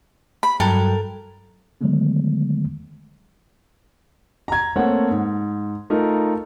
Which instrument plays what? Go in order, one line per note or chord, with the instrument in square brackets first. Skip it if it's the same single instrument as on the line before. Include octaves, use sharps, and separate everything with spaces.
[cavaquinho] B5
[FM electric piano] G2 F#3 G5 [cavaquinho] A4 A#4
[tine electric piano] D3 D#3 F#3 G#3 A3 B3
[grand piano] A#5 G#6
A3 A#3 C4 C#5 F#5
G#2
A3 D#4 F4 A#4